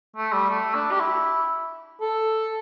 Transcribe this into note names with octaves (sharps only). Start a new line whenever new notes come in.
A3
G3
A3
D4
G4
E4
A4